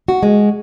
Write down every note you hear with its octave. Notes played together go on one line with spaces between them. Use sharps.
F#4
G#3